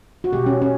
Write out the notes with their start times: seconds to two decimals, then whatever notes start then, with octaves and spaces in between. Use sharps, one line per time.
0.24 F#4
0.32 B2 G#3 G4
0.46 C#4
0.62 C#4